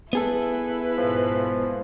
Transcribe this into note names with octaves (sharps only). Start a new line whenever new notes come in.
B3 E4 G#4 A4 B4
G#2 B2 F3